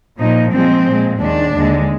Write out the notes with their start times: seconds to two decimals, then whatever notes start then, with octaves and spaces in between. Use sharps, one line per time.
0.18 A#2 F3 A#3 D#4
0.53 A#2 F3 G#3 C4
0.86 A#2 G#3
1.19 D#2 D#3 G#3 D4
1.53 D#2 D3 G#3